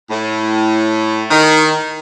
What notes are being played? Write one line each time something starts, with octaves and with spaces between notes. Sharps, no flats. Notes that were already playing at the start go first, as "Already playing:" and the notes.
A2
D#3